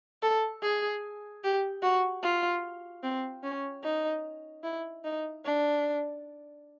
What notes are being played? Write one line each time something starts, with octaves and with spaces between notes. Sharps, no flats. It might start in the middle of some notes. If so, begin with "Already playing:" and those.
A4
G#4
G4
F#4
F4
C4
C#4
D#4
E4
D#4
D4